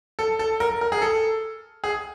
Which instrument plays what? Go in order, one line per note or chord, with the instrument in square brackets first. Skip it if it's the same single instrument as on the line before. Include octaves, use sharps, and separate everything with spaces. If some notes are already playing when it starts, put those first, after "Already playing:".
[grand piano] A4
A4
A#4
A#4
G#4
A4
G#4